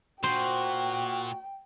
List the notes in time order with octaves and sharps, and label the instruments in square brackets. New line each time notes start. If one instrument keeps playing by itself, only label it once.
[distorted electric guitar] A#2 [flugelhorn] F#4 [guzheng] C5 [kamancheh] G5